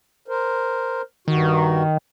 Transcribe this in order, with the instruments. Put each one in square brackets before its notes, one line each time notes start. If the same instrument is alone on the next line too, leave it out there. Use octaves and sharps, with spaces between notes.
[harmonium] A#4 C5
[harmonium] G2 F#4 [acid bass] D#3